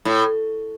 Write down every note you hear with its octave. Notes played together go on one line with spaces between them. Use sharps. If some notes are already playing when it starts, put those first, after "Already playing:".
A2